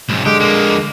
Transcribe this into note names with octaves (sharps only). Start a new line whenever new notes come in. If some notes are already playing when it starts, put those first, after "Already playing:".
B1 G#2
D3 G#3 G4
F2 A#3